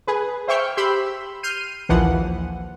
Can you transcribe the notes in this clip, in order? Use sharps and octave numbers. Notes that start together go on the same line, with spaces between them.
G#4 B4
C5 E5 G5 C#6 F6 G6
G4 B5 C6 E6 G6
F6 G6 C7 D#7
A#1 D#2 E3 F3 F#5